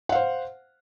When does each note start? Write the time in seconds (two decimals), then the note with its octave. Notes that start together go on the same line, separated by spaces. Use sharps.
0.09 F#5
0.12 F5
0.15 C5